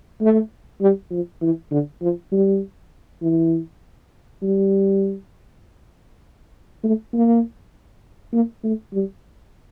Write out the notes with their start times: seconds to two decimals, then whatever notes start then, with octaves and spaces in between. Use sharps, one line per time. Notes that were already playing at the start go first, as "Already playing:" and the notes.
0.21 A3
0.81 G3
1.11 F3
1.41 E3
1.71 D3
2.02 F3
2.32 G3
3.22 E3
4.42 G3
6.83 A3
7.13 A#3
8.33 A#3
8.64 A3
8.93 G3